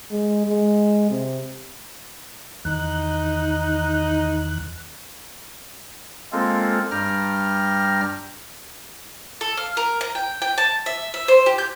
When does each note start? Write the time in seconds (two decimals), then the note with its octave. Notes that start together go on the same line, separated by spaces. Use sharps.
0.11 G#3
0.47 G#3
1.10 C3
2.65 E2 D#3 D#4 F#6
6.32 G#3 A#3 C4 F4 A4
6.91 G2 G3 G5 A#5 F6 A#6
9.41 A4
9.57 F5
9.77 A#4
10.01 A#5
10.15 G5
10.42 G5
10.58 A5
10.86 E5
11.14 E5
11.28 C5
11.46 G4
11.58 G6